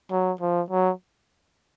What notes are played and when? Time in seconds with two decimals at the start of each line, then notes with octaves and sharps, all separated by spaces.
0.11 F#3
0.41 F3
0.70 F#3